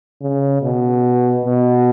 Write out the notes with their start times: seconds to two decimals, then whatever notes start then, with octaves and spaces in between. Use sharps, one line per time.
0.21 C#3
0.62 B2
1.45 B2